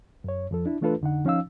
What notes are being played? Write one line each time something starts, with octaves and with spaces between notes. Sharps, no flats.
F#2 C#5
F2 F3 A4
D4 E4
E3 A3 D4 F4 A4 B4
F2 D3 D#4 F#5
F3 C#4 D#4 F5 E6